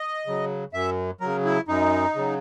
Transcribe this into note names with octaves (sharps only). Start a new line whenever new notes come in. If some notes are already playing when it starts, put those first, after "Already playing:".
Already playing: D#5
C#3 F#3
F#2 E5
C#3 F#3 A#4
E4
F#2 D#4
C#3 F#3